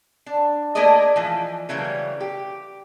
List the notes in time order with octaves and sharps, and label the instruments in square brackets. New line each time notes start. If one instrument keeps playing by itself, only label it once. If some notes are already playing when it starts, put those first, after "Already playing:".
[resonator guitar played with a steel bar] D4
A3 A#3 G#4 A#4 D5 D#5
E3 F3
C#3 E3 F#3 G3 A3 A#3
G4